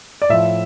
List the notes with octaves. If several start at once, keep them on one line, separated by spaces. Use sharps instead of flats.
D5
A2 F3 E5